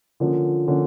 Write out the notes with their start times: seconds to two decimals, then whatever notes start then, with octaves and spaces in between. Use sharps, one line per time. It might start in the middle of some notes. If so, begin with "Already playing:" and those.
0.20 D3 F3 A#3 C#4
0.67 D3 F3 A#3 C#4